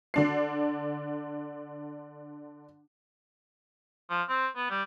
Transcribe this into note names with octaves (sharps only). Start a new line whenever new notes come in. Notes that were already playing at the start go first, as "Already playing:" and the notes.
D3 D4 C7
F3
C4
B3
G3